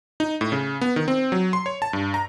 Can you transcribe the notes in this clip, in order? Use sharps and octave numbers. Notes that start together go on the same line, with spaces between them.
D#4
A2
C#3
B3
D#3
C4
F#3
C6
C#5
A5
G2
A#5